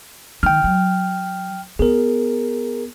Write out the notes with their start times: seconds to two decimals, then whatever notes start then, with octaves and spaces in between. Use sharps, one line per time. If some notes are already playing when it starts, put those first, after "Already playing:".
0.43 D#3 G5 F6
0.64 F#3
1.79 B3 G#4 A#4